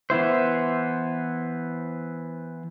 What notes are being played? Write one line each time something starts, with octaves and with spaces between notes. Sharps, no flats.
E3 B3 E4 C5